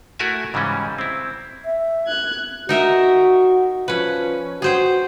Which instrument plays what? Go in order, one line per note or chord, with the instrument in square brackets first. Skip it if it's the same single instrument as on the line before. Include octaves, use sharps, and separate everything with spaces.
[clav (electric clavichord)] A3 E4 F#4 A#4 E5 G#5
G#2 C#3 E3 G3 C#4
C4 E4
[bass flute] E5
[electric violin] F#6 G#6
[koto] D#4 A#4 E5 [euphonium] F#4
[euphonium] F3 [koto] C#4 B4
[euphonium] F#4 [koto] G#4 C5 G5